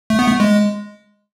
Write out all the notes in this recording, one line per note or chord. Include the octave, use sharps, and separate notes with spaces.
A3
B3
A3
G#3